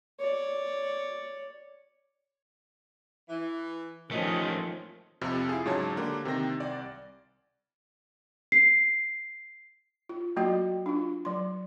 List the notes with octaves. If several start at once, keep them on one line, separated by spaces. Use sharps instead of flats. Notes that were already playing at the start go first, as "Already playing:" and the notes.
C#5 D5
E3
D#3 F3 G3 A3 C#4 G4 D#5
F2 C3 F3 F6
E4 F4 G#4
G#2 C#3 F#3 C#5 A5
D3 A#3 D4 G4
C3 D#3 G5 A#6
C2 D5
C7
F4
F#3 A#3 F#4 D#5
D4 F4
F#3 C6